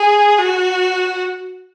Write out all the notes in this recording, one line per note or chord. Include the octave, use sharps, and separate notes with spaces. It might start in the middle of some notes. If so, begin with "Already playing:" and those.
Already playing: G#4
F#4